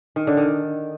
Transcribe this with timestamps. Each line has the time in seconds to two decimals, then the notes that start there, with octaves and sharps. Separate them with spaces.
0.16 D#3
0.27 D3
0.37 D#3